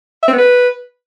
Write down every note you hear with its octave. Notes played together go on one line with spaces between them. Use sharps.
E5
C4
B3
B4